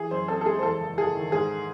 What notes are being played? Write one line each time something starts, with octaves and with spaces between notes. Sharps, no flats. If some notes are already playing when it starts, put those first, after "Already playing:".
Already playing: E3 G#4
F#2 C5
C4 A4
A4
G#3 G#4
C5
E2 A4
F#1
F#1 G#4
D#3
G#2 G#4